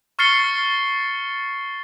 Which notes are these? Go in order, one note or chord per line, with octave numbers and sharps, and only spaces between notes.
C#6 F6 A6 C7 C#7 G7